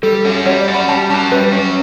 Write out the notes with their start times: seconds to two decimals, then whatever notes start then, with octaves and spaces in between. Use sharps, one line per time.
0.03 G3 A4
0.25 C#4 F#4
0.46 G3 C#5
0.61 D5
0.68 C#4 F#4
0.74 B5
0.88 G3 A5
1.10 C#4 F#4 A5
1.31 G3 B4
1.52 C#4 F#4